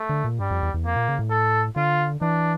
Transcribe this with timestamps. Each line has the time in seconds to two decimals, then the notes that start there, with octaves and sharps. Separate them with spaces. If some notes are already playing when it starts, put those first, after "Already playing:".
Already playing: A3
0.09 D3
0.24 A#2
0.40 G2 G3
0.51 F2
0.63 E2
0.74 E2
0.86 F2 A#3
0.96 A#2
1.08 C#3
1.19 A2
1.30 A4
1.76 D3 F4
2.21 E3 D4